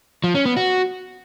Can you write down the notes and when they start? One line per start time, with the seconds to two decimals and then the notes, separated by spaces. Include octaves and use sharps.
0.24 F3
0.35 C#4
0.46 B3
0.57 F#4